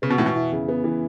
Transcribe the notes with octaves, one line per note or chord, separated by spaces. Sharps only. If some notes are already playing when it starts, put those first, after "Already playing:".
C#3 B3
B2
A2 E3
B2
E4
C#3
B3
E3